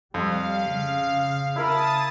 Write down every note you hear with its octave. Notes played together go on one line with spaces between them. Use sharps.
F2 G3 F5
C#3
E4 A#4 A5 B5 D#6 A6